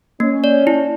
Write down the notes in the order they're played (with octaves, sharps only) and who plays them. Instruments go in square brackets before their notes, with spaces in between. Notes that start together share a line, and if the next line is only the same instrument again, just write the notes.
[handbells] A#3 [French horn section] C#4
[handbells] D5
E4